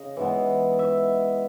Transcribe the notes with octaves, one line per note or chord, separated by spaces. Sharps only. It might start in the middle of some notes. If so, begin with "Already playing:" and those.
Already playing: C#3 D#5
E3 G#3 B3
E5